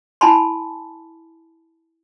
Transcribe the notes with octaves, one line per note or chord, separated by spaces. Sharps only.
E4 G#5 A5 B5 C6